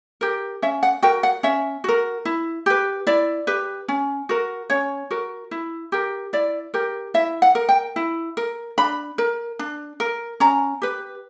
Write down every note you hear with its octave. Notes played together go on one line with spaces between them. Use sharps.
G4 A#4
C#4 E5
F#5
F#4 A#4 G5
F#5
C#4 E5
F#4 A#4
E4
G4 B4
E4 D5
G4 B4
C#4
F#4 A#4
C#4 C#5
F#4 A#4
E4
G4 A#4
E4 D5
G4 A#4
E4 E5
F#5
A#4
G5
E4
A#4
D4 B5
A#4
D4
A#4
C#4 A#5
G4 B4